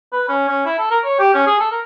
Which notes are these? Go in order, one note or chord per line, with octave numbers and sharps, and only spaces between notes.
B4
C#4
C#4
E4
A4
A#4
C#5
G4
C#4
G#4
A4
A#4